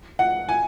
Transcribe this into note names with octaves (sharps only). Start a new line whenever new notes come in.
F#5
G#5